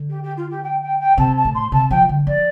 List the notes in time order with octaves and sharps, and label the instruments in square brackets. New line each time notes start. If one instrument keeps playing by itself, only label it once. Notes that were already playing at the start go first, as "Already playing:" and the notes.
Already playing: [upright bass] D3
[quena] G4
G4
F4
G4
G5
G5
G5
[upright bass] C3 [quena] A5
[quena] A5
[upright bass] A2
[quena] C6
[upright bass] C3 [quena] A5
[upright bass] F3 [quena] G5
[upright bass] D3
[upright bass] F3 [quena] D5